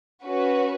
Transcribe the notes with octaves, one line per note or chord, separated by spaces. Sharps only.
C#4 F#4 B4